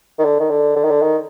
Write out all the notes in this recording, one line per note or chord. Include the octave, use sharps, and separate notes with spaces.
D#3
D3
D#3
D3
D3
D#3
D3
D#3